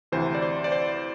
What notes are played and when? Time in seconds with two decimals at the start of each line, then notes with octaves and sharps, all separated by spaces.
0.12 D2 C3 E3 C5
0.35 D5
0.42 C5
0.64 D5
0.72 C5